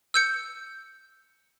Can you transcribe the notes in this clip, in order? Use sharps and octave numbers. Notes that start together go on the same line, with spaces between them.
E6 G6 C#7